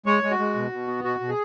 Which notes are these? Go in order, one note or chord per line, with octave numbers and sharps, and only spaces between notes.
G#3 C#5
G#3
F#4
G#3
B2
B2
B3
B2 F#4
B2
G#4